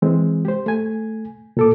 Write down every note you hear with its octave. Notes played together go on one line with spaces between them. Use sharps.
E3 G#3 C4
G4 C5
A3 G#5
A#2 A4 D6